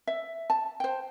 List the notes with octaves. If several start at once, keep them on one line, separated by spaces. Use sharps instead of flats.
E5
A5
C5 G5